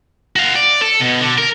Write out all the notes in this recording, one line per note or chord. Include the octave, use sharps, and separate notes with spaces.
F#4 F5
D5
A4
B2
D3
A#4